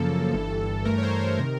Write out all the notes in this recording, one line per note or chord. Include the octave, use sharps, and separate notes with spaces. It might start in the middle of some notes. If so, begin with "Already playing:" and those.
Already playing: F#2 C#3 F3 A#3 A4
G1 G2 E3
G2 E3 A3 A#4
C#5
C5
A#4
C3 D#3